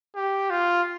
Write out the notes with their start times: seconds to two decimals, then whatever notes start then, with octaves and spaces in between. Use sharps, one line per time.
0.15 G4
0.50 F4